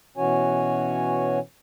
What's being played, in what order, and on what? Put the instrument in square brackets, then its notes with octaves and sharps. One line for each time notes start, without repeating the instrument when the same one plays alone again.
[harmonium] B2 E3 C#4 F#4 C#5 G#5